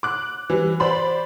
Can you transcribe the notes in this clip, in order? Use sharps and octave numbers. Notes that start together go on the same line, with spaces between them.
D6 F#6
E3 G3
C5 D5 B5 C6